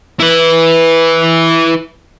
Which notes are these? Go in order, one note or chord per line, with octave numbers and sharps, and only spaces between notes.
E4 B4